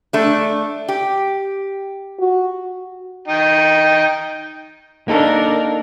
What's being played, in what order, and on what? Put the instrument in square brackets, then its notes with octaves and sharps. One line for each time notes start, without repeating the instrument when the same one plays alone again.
[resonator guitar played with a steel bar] A3 D4
G4
[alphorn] F#4
[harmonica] D#4 G5
[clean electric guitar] A#3 D#4 A4 [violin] D4 A#4